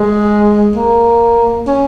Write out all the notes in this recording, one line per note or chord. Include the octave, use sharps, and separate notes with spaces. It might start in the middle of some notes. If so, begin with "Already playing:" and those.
Already playing: G#3
A#3
C#4